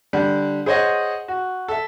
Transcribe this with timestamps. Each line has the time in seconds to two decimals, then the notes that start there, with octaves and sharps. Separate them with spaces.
0.13 D3 G3
0.66 G#4 C5 C#5 D#5 F#5
1.28 F#4
1.68 A4 E5